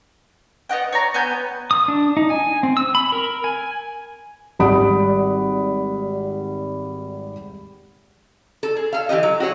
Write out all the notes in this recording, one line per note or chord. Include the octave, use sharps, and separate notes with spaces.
B3 D#5 F#5 G5
C#5 D5 A#5
B3 G5 G#5 G6
D#6
D4
D#4
G#5
C4
E6
B5
A#4
G#5
G#1 G3 F#5 B5 D#6 D7
A4
G#4
A4 F5
E3 F3 G4 D#5
F#3
F#4 G#4 C#5